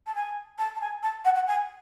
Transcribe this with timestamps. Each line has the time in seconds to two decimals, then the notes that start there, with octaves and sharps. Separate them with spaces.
0.07 A5
0.15 G#5
0.58 A5
0.75 A5
0.81 G#5
1.03 A5
1.25 F#5
1.35 F#5
1.47 G#5